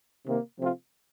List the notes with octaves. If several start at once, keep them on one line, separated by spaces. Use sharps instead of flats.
C3 D#3 A#3
C3 F3 A3 C4 F4